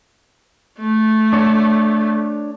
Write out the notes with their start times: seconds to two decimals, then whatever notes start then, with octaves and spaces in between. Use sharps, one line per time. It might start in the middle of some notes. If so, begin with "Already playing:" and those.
0.79 A3
1.33 D4 C#5 A5